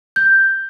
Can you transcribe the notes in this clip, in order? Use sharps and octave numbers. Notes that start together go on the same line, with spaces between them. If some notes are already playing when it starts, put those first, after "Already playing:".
G6